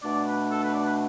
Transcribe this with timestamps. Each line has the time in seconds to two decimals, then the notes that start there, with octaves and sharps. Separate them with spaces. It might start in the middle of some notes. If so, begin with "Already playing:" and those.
0.03 B2 A3 D4 D5
0.26 B4
0.49 A4
0.61 B4
0.72 D5
0.84 B4